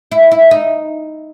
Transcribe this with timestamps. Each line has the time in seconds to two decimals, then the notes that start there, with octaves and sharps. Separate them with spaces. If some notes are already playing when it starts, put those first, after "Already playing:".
0.12 E4
0.31 E4
0.51 D#4